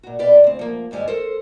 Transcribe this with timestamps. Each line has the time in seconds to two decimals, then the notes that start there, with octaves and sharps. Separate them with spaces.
0.03 A#2 F#4
0.19 B2 F4 G4 B4 D5
0.44 D2 C4
0.59 F3 A#3
0.91 D#2 G#2 G3 G#3 G#5
1.08 A4 A#4 C5